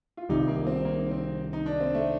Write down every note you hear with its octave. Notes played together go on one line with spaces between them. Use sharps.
F4
C2 C3 D#3 G3 D#4
A#3
C4
A#3
C4
D#4
D4
C4
A3